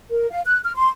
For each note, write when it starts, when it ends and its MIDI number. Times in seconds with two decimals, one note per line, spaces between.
0.11 0.27 70
0.31 0.40 77
0.45 0.60 90
0.64 0.71 89
0.76 0.89 84